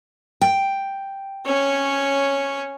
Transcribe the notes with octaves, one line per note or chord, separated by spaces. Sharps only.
G5
C#4 C#5